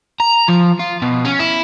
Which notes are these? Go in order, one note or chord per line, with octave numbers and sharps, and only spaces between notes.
A#5
F3
F4
B2
C#4
E4